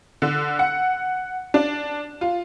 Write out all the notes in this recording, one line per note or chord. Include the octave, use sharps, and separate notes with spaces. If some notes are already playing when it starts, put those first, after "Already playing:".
D3
F#5
D4
F4